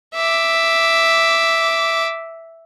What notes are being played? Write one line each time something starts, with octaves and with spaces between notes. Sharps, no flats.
E5 D6